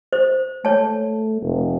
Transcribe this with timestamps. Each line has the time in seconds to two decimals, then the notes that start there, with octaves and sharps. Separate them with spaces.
0.13 C5
0.65 A3 C#5 A5
1.42 F1